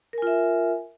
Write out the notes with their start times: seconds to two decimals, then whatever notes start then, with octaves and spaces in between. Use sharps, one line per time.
0.13 A#4
0.18 G#5
0.22 F4
0.27 E5